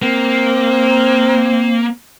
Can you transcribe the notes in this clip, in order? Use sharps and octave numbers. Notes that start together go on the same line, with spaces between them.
A#3 C4